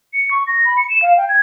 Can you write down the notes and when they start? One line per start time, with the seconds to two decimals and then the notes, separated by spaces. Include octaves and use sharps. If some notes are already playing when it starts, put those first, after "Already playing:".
0.14 C#7
0.31 C#6
0.47 A#6
0.65 B5
0.77 C#7
0.90 E7
1.02 F5
1.17 G5
1.29 G#6